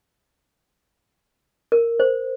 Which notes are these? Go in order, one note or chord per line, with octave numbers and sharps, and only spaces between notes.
A#4
C5